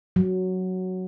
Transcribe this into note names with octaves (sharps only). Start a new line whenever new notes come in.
F#3